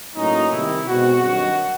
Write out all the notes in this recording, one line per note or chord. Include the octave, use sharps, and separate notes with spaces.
A2 F#3 A#3 C#4 D#4
C3 D#3 G3 E4
B2 G#3 C4 F#4
G2 D#3 F#3 F#4